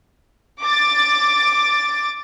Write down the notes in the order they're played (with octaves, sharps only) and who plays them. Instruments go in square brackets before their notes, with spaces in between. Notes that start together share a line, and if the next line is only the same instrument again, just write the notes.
[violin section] D6 A6